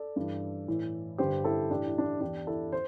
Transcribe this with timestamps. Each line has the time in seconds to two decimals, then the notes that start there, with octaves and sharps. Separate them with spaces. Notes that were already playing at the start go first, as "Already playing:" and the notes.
Already playing: A4 D5
0.16 G2 E3
0.68 A2 E3
1.18 G2 D3 G4 C5
1.44 E4 A4
1.70 A2 E3 D4 G4
1.87 E4
1.98 D4
2.04 E4
2.21 E2 E3 D4 G4
2.47 E4 A4
2.72 C5